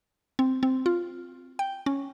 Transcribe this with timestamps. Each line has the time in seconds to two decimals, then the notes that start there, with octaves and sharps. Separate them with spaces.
0.39 C4
0.63 C4
0.86 F4
1.59 G5
1.86 C#4